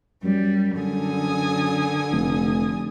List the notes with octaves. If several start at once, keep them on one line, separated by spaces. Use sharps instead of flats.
F#2 G3
D3 G#5 D#6
F1